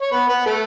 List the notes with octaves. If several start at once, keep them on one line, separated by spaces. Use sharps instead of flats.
C#5
B3 B4
B3 B4
A3 A4